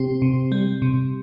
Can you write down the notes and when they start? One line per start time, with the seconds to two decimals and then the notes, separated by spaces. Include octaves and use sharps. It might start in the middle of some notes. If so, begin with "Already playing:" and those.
Already playing: C3 C4 G4
0.22 C3
0.52 G3
0.82 C3